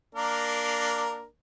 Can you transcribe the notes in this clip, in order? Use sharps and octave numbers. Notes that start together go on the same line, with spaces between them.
A#3 D4 A#4